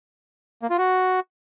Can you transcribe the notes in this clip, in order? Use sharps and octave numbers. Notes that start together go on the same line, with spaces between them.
A#3
F4
F#4